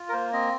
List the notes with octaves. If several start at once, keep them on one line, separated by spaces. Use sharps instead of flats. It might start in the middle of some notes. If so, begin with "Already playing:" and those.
Already playing: F4
A#4
A#3 C5
C4 D#5